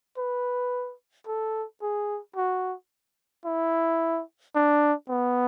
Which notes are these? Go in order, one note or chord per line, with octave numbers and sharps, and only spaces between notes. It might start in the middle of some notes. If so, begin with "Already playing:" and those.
B4
A4
G#4
F#4
E4
D4
B3